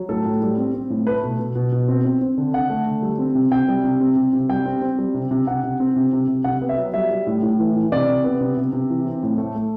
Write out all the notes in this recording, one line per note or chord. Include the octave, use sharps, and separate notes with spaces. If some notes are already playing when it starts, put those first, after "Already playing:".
Already playing: F#3
A2 A4
A2
G3
C4
C4
A2
A3 B4
B2
B2
B2
B2
C4
C4
C4
D3
D3 F#5
A3
D3
G3
C4
C3
C3 G5
G3
C3
C4
C3
C3
G3 G5
C4
C4
G3
C3
C3
C3 F#5
C3
C4
C3
C3
C3
C3 F#5
B3
E5
F#3
G3 E5
G3
A2
A2
E3
E3
C3 D5
C3
B3
C3
C3
C3
E3
C4
A2
A3
A3